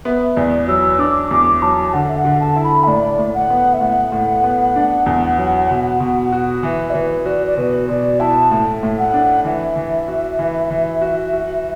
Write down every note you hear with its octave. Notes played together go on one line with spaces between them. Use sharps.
B3 E5
E2 D5
F#3 E6
D4 D6
E2 D6
F#3 A5
D3 F#5
E5
F#5
D3
A5
E4
B5
E5
A2 D5
A2
F#5
B3
E5
A2 F#5
A2
B3
D4
E2
F#3
B2
B2
F#4
E3 E5
D5
E3 B4
F#4 D5
D5
B2 B4
B2 D5
E4 A5
A2
A2
F#5
D4
E3 E5
E3
F#4
E3
E3
F#4
F#4